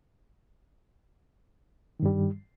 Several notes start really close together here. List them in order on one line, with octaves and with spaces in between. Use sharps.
D#3 G2 G3